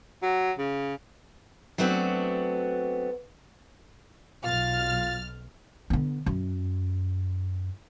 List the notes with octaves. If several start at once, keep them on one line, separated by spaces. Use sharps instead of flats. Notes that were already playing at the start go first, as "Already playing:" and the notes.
F#3
C#3
F#3 A3 B3 C4 D4 F#4
B1 F4 F6 A6
D3 B3
F#2